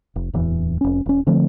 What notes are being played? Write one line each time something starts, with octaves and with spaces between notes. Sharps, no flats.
F1
D1 E2 E3
F1 C#4
E1 C#4
D3 F3 A3 C4